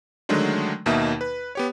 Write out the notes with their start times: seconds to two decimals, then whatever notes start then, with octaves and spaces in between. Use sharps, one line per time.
0.29 D3 D#3 F#3 G#3 A3 D4
0.86 D#2 B2 A#3 D#4 E5
1.21 B4
1.55 B3 G4 C#5